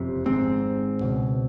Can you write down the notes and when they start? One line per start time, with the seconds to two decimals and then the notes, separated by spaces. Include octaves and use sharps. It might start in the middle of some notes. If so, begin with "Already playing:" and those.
Already playing: F#1 F2 C3
0.26 G#1 G#2 C4
1.01 C#2 B2